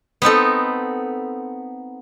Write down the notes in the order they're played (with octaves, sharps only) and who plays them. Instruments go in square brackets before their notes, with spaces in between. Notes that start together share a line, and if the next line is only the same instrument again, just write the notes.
[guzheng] B3 C4 D#4 A4